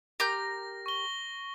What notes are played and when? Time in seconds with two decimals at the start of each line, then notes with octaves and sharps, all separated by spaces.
0.20 G4 A#4 G6 A#6
0.86 C#6 G7